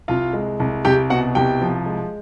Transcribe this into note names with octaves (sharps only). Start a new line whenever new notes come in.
C2 F4 F5
G#3
C2
C2 G4 G5
B2 F#4 F#5
C2 G4 G5
F3
G#3